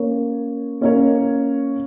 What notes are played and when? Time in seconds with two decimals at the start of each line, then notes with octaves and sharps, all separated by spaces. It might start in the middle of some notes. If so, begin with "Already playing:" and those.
Already playing: A#3 C#4 A#4 C#5
0.81 A#3 C#4 A#4 C#5